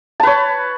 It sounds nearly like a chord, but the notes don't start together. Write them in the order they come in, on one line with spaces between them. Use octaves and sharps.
A5 B4 C#5